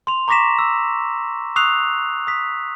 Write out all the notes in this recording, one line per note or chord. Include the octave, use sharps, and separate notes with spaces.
C6 F7
A#5 C#6 D6 A#6 B6 E7
E6
C#6 D#6 E6 F#6 C7 F7
D#6 B6